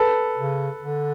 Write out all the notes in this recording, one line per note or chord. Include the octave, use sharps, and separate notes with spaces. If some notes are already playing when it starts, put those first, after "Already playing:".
Already playing: A4 B4
C#3
D3